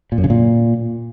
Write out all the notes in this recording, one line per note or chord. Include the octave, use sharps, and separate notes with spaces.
A#2
F#2
C#3
A#2